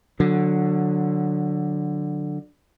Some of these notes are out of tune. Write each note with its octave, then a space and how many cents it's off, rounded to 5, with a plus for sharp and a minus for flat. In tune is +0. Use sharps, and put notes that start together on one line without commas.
D3 +10 F#3 -15